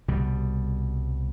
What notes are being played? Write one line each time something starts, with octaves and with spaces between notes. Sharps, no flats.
C2 B2 G3